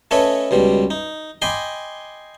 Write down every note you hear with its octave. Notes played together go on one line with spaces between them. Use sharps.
A3 C#4 A4 B4 C#5 D#5
C#2 B2 G3
D#4
D#5 G5 G#5 B5 C6 D6